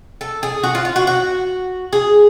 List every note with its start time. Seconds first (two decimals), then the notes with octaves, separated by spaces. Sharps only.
0.21 A4
0.43 G#4
0.63 F#4
0.75 F4
0.85 F4
0.96 F#4
1.07 F#4
1.93 G#4